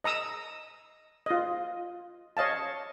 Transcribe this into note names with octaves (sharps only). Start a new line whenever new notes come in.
D#5 A#5 D#6 E6
F4 D#5
C#5 D#5 F5 A5